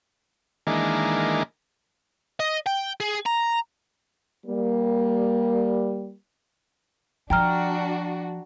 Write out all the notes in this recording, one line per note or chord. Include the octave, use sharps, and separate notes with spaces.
D#3 E3 G#3 A#3 D4
D#5
G5
G#4
A#5
G3 A#3
F3 D4 F#4 G5 A#5 F6